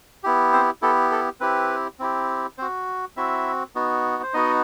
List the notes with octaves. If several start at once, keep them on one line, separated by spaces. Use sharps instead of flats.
B3 E4 G4
C4 C5
B3 E4 G4 A4
A4
C4 E4 G4 B4
C4 E4 G4
C4 F#4 C5
C4 E4 F#4 E5
B3 D#4 F#4
C5
B3 D#4 F#4 D#5